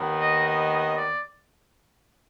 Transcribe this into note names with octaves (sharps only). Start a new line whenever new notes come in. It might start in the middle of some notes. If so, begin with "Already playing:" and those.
Already playing: D#2 D#3 B3
D#5
D#5
D#5
D5